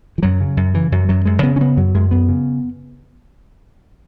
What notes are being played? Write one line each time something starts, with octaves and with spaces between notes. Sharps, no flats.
E3
F#2 F#3
C#3
F#2
C#3 E3
F#2 F#3
F#2 F#3
F#2 G#3
C#3 B3
C#4
C#3 B3
F#2 F#3
F#2 G#3
F#2 B3
C#3